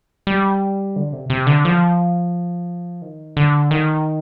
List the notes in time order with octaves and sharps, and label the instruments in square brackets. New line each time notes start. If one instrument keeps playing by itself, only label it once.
[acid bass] G3
D3
C3
C3
D3
F3
D#3
D3
D#3